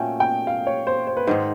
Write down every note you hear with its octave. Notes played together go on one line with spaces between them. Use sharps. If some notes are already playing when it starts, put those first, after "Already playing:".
Already playing: A#2 F#3 A3 C#4 G5 G#5
G5
F5
C#5
C5
C5
B4
G#2 D#3 G#3 C5